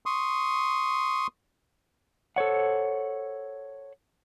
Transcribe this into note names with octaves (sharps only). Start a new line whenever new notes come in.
C6 C#6 D#6
A4 C5 C#5 F#5